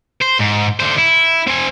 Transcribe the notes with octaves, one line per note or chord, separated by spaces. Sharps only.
C5
G#2
D3 C5
E4
C4 G#5